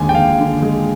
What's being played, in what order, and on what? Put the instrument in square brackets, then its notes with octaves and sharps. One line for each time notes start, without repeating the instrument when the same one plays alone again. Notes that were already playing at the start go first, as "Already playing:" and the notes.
Already playing: [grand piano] D#2 D3 G#3 G#5
G5
D#2 F5
D3
G#3